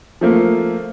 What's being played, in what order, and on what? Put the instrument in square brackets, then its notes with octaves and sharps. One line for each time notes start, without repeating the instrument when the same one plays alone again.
[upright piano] F3 A3 A#3